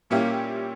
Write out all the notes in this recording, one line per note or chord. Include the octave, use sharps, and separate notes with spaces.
A#2 G3 A#3 C#4 E4 G4